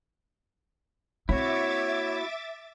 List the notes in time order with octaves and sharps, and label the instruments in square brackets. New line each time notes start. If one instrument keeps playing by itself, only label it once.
[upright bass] A#3 C4 [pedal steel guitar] E4 F#4 [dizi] C#5 [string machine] E5 D6 A6